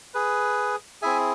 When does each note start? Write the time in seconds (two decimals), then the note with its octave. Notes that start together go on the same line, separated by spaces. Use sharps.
0.14 G#4 B4
1.02 C4 E4 G#4 E5 G#5